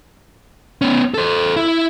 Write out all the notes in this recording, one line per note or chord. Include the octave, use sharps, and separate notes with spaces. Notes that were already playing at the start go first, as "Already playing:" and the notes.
B3 C#4
A4 C5
E4